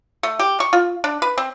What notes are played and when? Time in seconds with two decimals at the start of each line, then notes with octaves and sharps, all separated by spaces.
0.23 A3
0.39 G4
0.60 C#6
0.73 F4
1.04 D4
1.22 B4
1.38 C4